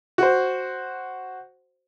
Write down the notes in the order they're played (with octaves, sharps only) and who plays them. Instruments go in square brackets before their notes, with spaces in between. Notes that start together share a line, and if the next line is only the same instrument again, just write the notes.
[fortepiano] F#4 C5